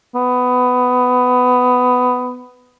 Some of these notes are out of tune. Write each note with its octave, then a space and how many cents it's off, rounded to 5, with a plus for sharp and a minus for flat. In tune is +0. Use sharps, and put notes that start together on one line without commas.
B3 +15